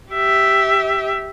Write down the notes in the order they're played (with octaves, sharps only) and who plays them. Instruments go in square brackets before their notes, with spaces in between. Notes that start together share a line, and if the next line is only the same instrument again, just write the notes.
[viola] G4 E5